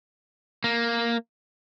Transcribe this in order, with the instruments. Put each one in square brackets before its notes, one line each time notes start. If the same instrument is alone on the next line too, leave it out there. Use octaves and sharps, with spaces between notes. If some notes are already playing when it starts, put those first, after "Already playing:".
[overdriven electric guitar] A#3